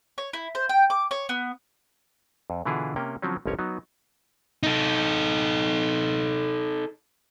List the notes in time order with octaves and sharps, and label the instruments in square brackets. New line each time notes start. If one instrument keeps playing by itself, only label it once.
[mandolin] C#5
E4
C5
G5
D6
C#5
B3
[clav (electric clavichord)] F2
B2 D3 E3 E4 F4 G#4
C3 A#3 C#4 G5
D3 F3 F#3 C4 C#4
G1 C2 F3 C#4 A#4 C#5
F#3 B3 D#4
[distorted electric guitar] D#4 A4